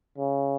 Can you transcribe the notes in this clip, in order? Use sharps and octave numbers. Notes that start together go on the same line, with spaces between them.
C#3